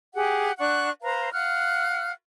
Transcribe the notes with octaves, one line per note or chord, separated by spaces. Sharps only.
G4 G#4 F#5
D4 F#5 C#6 F#6
B4 C5 F5 A#5
F5 F#5 F6 F#6